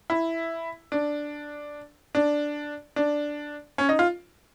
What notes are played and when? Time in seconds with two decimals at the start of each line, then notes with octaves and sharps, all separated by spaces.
0.10 E4
0.92 D4
2.15 D4
2.96 D4
3.78 C#4
3.89 D#4
3.99 F4